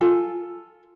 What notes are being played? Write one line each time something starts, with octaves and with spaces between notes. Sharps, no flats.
F4 A4 G#5